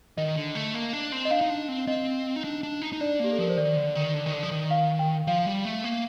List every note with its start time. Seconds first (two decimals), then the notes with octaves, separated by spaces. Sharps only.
0.17 D#3 D#5
0.36 D3
0.55 A3
0.74 A#3
0.93 D4
1.12 C4
1.25 D#5
1.31 D4 F5
1.41 D#4
1.50 D4
1.69 C4
1.87 C4 D#5
2.36 D#4
2.44 D4
2.63 D4
2.82 D#4
2.93 D#4
3.00 D4 D5
3.20 A#3 G4
3.32 A4
3.38 F3 A#4
3.49 C5
3.57 D#3 D5
3.76 D3
3.95 D#3
4.14 D3
4.26 D#3
4.33 D3
4.43 F3
4.51 D#3
4.71 F5
4.99 G5
5.27 F3 F5
5.46 G3
5.65 A3
5.84 A#3